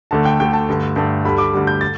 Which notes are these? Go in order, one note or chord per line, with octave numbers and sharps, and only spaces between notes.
D2 D3 A3 A5
G5
D2 D3 A3 G5
A5
G2 D3 A3
G2 D3 A3
D2 D3 G3 B5
D6
D2 D3 G3
G6
A6